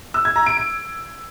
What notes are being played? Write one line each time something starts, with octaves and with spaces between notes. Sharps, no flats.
E6
G#6
A#5
D7
D7